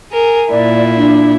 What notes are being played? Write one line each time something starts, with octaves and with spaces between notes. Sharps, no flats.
G#4 A#4
A#2 E4 D5
D4